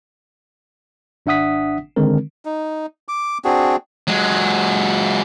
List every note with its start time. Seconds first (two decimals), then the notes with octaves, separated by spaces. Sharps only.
1.26 G#1 D4 E5 F#5 D#6 B6
1.96 D3 D#3 G#3 C4 A#4
2.45 D#4
3.08 D6
3.45 C4 D4 F#4 G#4
4.08 F#3 G#3